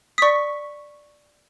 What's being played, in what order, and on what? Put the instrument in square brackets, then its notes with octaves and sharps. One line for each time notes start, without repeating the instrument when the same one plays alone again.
[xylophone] D5 D#6 [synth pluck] C#6 B6